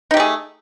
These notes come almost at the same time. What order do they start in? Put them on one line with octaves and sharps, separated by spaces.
D#4 G4 A3 G#4